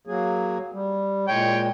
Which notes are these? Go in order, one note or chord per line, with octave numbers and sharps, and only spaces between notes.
F#3 A#3 G#4
G3
A#2 G#3 C#5 G5